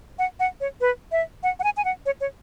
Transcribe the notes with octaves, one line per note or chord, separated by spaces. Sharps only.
F#5
F#5
C#5
B4
E5
F#5
F#5
G#5
G#5
F#5
C#5
C#5